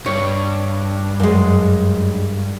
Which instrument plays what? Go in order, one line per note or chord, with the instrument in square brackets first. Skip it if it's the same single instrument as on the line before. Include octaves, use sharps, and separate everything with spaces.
[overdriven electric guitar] G2 [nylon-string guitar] C#5
[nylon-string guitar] F#2 G#3